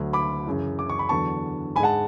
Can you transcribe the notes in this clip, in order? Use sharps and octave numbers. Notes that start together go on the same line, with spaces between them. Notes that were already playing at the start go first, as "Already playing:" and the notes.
Already playing: D2 D3 F#3
B5 D6
F#2 C#3 E3
D6
C#6
B5
E2 D3 F#3 A5 C#6
G#2 G#3 F#5 G#5 A5 B5